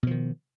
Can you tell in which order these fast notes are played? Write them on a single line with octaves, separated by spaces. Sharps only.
B2 F3 D#3